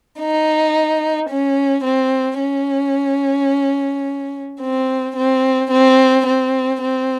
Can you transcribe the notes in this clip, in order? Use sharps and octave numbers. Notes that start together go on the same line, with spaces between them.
D#4
C#4
C4
C#4
C4
C4
C4
C4
C4